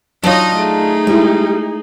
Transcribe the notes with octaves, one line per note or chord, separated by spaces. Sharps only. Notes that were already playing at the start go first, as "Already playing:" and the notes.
F#3 D4 D#4 F4 C#5 D#5
A3 D#4 G#4
G3 G#3 E4